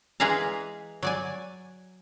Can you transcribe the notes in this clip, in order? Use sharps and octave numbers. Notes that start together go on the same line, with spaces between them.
E3 G#3 G#4 B4 F5 A#5
F#3 D5 G#5